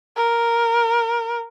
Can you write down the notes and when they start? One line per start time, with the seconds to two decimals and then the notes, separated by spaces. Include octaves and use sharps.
0.16 A#4